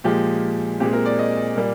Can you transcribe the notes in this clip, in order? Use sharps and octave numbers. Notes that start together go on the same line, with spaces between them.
A#2 F3 G#3 G4
A#2 G#3 C4 G4
A#4
D5
D#5
A#2 G3 A#3